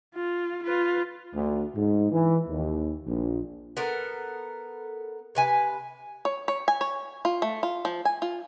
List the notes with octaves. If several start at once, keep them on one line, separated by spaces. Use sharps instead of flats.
F4
F4 B4
D2
G#2
E3
D#2
A#1
B3 A4 A#4
C3 B4 G#5
C#5
C#5
G#5
C#5
F4
A3
F4
F3
G#5
F4